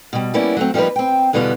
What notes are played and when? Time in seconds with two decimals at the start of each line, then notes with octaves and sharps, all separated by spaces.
0.13 B2 G3
0.34 G3 A#3 B3 C#4 E4 D5
0.57 F#3 A3 C4
0.74 F3 G3 A#3 D#4 B4
0.96 C4 G5
1.33 E2 B2 D3 G3 B3 F5